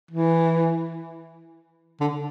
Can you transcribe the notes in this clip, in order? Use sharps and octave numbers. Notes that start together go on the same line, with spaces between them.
E3
D3